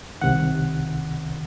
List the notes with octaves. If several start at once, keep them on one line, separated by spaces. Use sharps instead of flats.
C2 C3 D#3 F#5